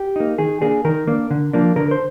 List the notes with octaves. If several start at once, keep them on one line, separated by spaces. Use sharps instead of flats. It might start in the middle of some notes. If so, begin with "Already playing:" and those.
Already playing: G4
A#3 D#4
D#3 G#4
A#3 D4 G#4
D#3 A#4
A#3 D4
D3
F3 A#3 D4
D3 A#4
C5